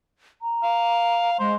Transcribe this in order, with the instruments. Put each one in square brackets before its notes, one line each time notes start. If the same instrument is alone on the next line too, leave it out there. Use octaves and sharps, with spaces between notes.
[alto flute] A#5
[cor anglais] F5
[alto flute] G#3 [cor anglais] C5